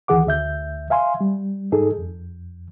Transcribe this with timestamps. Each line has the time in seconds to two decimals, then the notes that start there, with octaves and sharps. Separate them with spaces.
0.08 D2 D#3 E3 G#4 F#5 D6
0.27 D2 E5 G6
0.90 E5 F5 G#5 C6
1.21 G3
1.72 G#2 D#4 G#4 A4
1.99 F2